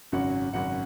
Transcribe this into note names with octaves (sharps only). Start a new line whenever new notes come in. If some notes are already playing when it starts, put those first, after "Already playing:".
G#1 F#2 C#3 F#3 F#5
G#1 F#2 C#3 F#3 F#5